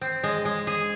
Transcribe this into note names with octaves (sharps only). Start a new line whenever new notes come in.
C4
G#3
G#3
G#4